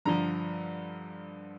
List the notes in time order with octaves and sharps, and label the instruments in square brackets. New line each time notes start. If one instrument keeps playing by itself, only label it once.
[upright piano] G2 D3 F3 A#5